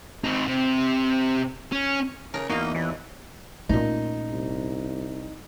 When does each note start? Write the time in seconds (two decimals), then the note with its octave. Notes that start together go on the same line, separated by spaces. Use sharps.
0.24 C4 D#4
0.48 C3
1.72 C#4
2.34 C#3 A#4
2.50 E2 A#3 D#4 F#4 D#5 F5
2.75 D#2 E3
3.69 A#2 A3 C#4 D#4
4.30 C2